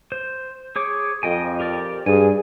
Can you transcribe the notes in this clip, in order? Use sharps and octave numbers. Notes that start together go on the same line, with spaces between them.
C5
G#4 C#5 D6
F2 D#5 G5 G#5
G4 A#4 D5
G2 G#4 G#5